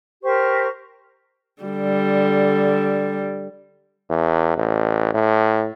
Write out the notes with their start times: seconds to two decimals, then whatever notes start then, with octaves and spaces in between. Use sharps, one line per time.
0.23 G4 A#4 C5 C#6
1.63 D3 G3
4.10 E2
4.57 A1
5.14 A2